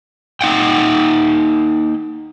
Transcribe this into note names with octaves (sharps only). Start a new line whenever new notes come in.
A#3 D#4 F#5 G5